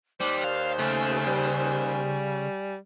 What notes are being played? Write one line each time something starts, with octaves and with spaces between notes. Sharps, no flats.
D#2 G3 C5 D6
D5 F5
C#3 A3 G#5
G3